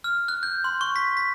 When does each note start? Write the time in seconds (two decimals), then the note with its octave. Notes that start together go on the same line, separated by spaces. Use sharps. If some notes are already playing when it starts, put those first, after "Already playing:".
0.04 F6
0.28 F#6
0.43 G6
0.64 C6
0.81 C#6
0.96 B6
1.17 B6